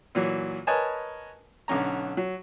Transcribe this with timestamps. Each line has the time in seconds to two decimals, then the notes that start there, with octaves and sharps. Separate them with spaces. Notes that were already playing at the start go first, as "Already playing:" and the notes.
0.15 A#2 E3 F#3
0.67 A#4 B4 C#5 D#5 G#5 A5
1.68 B1 D3 C#4 A#5
2.17 F#3